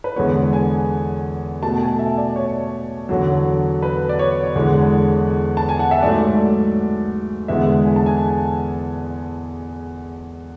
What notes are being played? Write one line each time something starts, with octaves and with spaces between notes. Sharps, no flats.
B4
E2 D3 G#3 B3 C#5
G#5
B2 A3 A5
G#5
E5
D5
C#5
E2 D3 F#3
B4
D5
C#5
E2 D3 G#3
A5
G#5
F#5
E5
G#2 F#3 A3 D5
E2 D3 G#3 B3 E5
G#5
A5
G#5